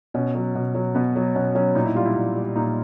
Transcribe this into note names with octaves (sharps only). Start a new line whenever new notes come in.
B2 C#4
F#3
B2
F#3
B2 B3
F#3
B2 C#4
F#3 C#4
A#2 D#4
E4
G3 F4
E4
A#2
G3
A#2 D#4